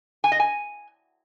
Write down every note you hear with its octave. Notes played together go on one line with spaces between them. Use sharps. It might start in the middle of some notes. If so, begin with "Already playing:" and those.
G#5
D#5
G#5